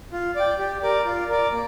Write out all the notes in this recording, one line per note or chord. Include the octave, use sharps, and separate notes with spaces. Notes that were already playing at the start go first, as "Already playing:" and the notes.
F4
D5 G5
G4
A#4 D5
F4
A#4 D5
A#3